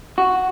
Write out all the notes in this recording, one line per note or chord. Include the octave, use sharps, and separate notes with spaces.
F#4